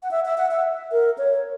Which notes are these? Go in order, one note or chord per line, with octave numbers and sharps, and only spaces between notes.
F#5
E5
E5
F#5
E5
A#4
C#5